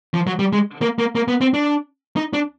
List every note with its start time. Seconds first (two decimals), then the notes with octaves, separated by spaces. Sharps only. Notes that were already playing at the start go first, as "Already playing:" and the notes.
0.14 F3
0.27 F#3
0.39 G3
0.53 G#3
0.82 A#3
0.99 A#3
1.15 A#3
1.28 B3
1.41 C4
1.54 D4
2.17 D#4
2.33 D4